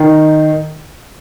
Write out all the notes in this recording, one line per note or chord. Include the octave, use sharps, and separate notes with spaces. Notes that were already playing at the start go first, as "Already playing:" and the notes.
Already playing: D#3 D#4